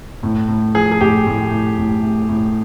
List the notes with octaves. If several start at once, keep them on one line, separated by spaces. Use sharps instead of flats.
A2
A2
F3 G#4
G#4
A2 G4
A2
A2
A2
A2
A2